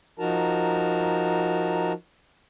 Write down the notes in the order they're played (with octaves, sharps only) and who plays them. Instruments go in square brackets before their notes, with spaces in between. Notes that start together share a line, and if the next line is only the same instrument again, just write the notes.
[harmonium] F3 D#4 F#4 A#4 A5 A#5